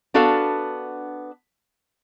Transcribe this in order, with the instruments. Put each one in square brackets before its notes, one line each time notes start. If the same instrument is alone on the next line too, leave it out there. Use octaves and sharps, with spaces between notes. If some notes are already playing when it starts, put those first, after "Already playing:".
[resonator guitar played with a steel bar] B3 D4 F#4 A4 F5